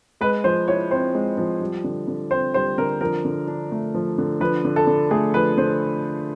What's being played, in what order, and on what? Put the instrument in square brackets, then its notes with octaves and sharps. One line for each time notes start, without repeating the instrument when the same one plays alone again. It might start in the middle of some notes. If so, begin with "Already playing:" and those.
[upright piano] G#3 [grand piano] B4
[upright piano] F3 [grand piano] C5
[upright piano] E4 [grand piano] C#5
[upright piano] C4 [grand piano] C5
[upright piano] G#3
F3
G3
D3
D3
[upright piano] C4 [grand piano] C5
[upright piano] G3 [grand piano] C5
[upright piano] D3 [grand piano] A#4
[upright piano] F3 [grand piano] A#4
[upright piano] D3
D4
A3
F3
D3
[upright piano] F3 [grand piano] B4
[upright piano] D3
[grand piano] A4
[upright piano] D3
[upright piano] A3 [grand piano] G#4
[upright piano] F3 [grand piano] B4
[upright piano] D3 [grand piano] C5